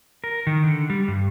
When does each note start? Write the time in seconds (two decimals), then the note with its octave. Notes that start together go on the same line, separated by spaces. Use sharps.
0.24 A#4
0.47 D#3
0.64 D3
0.90 G3
1.08 G2